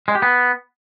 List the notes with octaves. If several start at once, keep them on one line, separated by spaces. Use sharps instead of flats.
G#3
G4
B3